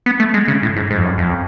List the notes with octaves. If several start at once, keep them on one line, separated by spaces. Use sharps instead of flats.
B3
A3
G#3
C#3
A2
G#2
G#2
F2
F#2
F2